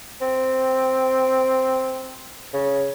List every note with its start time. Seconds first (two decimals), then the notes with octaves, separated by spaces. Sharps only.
0.21 C4
2.54 C#3